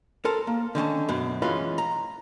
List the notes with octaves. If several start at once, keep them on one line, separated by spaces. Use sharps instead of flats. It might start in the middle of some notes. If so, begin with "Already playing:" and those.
A4 A#4 C5 A5
A#3
D3 D#3 C#4 A5
F#2 B2
E3 G#3 C#4 F4 B4
A#5